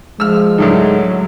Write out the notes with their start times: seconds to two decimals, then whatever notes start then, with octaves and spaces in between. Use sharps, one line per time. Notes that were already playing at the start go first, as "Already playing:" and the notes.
0.20 F3 G#3 E6 F6
0.58 D2 A2 D#3 F#3